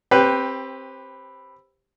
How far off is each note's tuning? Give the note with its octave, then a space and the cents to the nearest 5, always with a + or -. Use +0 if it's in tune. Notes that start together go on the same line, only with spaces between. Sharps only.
C4 +20 G4 +5 B4 +0